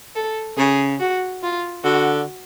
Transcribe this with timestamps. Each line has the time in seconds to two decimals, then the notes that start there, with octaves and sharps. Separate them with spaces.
0.15 A4
0.57 C#3 G#4
0.99 F#4
1.43 F4
1.84 D3 F#4